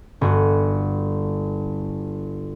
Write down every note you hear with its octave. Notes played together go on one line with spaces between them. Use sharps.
G1 F#4 F#6